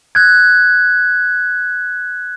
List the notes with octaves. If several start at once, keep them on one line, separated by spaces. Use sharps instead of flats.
F#6 G#6